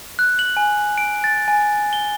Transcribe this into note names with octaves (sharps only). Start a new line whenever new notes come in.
F#6
F#7
G#5
D7
A6
G#5
G7